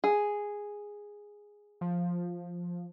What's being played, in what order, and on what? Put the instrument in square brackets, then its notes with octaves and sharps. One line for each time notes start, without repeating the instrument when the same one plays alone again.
[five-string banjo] G#4
[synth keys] F3